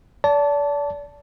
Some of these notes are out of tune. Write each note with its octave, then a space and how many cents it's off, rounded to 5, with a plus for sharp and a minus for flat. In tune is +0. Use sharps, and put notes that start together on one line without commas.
D5 -35 A5 +0